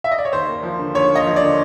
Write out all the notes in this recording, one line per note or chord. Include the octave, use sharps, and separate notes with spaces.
E5
D#5
D5
C#5
D#2 C5
A#3
F3
D3
D#2 C#5
A#3
D#5
F3
D5
D3